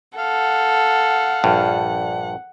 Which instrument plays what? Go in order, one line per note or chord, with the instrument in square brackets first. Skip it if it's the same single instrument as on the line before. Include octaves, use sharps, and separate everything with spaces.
[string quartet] A4 [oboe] F5 [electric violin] F#5
[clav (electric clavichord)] A#1 G2